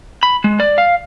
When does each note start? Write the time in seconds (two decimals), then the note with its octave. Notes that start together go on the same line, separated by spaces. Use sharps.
0.23 B5
0.44 G#3
0.60 D5
0.78 F5